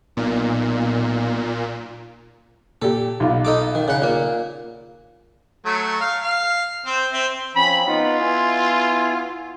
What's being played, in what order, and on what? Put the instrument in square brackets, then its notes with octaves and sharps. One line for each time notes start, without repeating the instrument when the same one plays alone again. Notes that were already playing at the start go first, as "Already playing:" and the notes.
[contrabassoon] B1 [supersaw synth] A#2
[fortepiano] A#2 G4 [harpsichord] A4
[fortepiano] B1 F4
[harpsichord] D#4 A4 D6
D#3
C#3 F#5
A#2 A#3
[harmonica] F#3 A3
F5
F5
C4 C5
C4 E5
[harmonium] F3 C4 C#4 [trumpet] B5
[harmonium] B3 D#4 F#5 [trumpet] F4
[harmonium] B3 E4 G#5